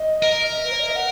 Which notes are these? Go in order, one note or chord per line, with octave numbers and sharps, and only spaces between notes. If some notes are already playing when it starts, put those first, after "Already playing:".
Already playing: D#5
A#4
E5
B4
C#5
D#5
E5
F#5